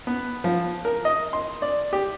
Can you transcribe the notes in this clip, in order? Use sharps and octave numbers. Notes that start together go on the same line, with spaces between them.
B3
F3
A#4
D#5
C6
D5
G4